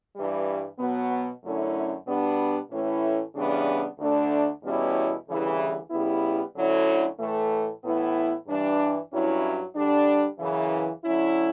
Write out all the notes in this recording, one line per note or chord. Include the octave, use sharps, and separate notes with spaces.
G2 E3 G3
B2 F#3 B3
F#2 D3 A3 C#4 E4
B2 G3 B3 D4
A2 E3 A3 C#4 E4
C#3 E3 G3 B3 D4
D2 D3 A3 D4
E2 B2 G3 C#4 E4
D2 C#3 E3 G3
C#3 G3 B3 E4
D2 D3 F#3 C#4 E4
A2 E3 A3
A2 E3 B3 E4
G2 E3 G3 D4
G2 F#3 C#4 E4
D3 G3 D4
F#2 C#3 E3
D3 F#3 C#4 E4